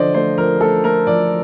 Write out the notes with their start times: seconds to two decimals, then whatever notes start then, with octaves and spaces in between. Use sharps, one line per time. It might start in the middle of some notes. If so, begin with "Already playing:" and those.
Already playing: D3 F3 C5 D5 D#5
0.14 A3 C5
0.38 F3 A#4
0.61 A3 A4
0.84 A3 A#4
1.07 F3 D5